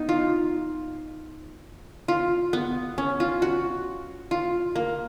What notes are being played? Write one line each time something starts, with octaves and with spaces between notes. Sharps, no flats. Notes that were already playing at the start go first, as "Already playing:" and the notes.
Already playing: B3 D#4
F4
F4
B3
C#4
F4
F#4
F4
A#3